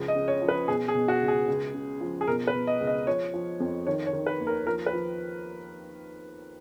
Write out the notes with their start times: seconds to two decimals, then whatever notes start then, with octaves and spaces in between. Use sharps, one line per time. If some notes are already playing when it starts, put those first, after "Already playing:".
Already playing: C#2 F3
0.08 D#5
0.15 C#3
0.28 C#5
0.42 F3
0.49 B4
0.68 B2 G#4
0.88 G#4
0.95 B2
1.08 F#4
1.21 C#2
1.28 G#4
1.48 C#2
1.74 C#3
2.01 F3
2.21 G#4
2.28 B2 A#4
2.47 B4
2.54 B2
2.67 D#5
2.80 C#2
2.87 D#5
3.07 F3 C#5
3.34 F3
3.60 F2
3.87 D#3 C#5
4.06 C#5
4.13 D#3
4.27 B4
4.40 D#2
4.47 A#4
4.66 F3 A#4
4.86 B4
4.93 F3